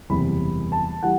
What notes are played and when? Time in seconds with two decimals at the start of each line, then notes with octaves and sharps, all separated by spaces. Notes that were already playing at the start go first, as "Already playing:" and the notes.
0.09 F#1 E2 C3 G3 B5
0.72 A5
1.03 E3 G3 F#5